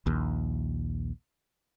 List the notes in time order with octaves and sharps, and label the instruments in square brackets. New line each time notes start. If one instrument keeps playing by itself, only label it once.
[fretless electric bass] A#1 D#2